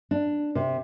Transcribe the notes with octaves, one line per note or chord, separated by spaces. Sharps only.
D4
C3